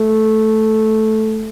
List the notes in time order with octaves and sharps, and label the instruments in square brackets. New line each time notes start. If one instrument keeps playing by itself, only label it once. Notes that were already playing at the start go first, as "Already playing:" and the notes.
Already playing: [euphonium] A3